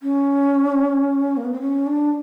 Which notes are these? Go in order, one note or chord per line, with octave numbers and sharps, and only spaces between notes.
C#4
A#3
B3
C4
C#4
D4